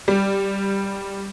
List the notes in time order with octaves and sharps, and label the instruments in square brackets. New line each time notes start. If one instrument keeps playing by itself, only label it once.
[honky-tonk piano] G3